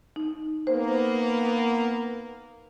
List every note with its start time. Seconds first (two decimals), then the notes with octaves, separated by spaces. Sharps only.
0.16 D#4
0.67 A#3 B3 C5